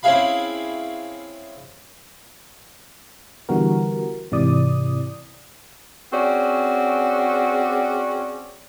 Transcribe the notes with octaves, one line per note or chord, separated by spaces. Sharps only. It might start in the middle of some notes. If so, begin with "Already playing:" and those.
C4 C#4 E4 G#4 F5 B5
D3 E3 G3 B3 F#4 A#4
G#2 C3 E3 D5 D#6
C4 C#4 F#4 G#4 D5